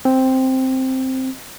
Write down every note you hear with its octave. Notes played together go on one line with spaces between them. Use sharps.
C4